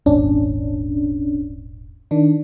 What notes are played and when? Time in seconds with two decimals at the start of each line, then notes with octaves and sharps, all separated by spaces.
0.06 D#1 G#1 C#4 D4
2.11 D#3 D4